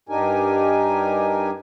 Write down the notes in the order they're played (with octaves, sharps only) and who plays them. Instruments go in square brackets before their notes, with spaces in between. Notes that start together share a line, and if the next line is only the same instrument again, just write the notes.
[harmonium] G2 D4 D#4 G4 A#4 G#5